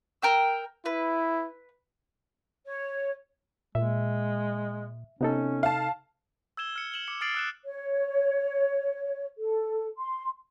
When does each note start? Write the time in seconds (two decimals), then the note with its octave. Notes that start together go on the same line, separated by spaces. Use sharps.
0.22 A#4 G5 E6
0.86 E4 B4
2.65 C#5
3.75 A#2 G#3 E5
5.21 C3 B3 C#4 D#4 A4
5.63 F5 A5
6.57 E6 G#6 E7 G7
6.76 F6 C#7
6.92 E7 F#7 G7
7.08 D6 C#7
7.21 D#6 F6 A6 C7 D7 F#7
7.35 E6 F#6 E7
7.65 C#5
9.38 A4
9.97 C6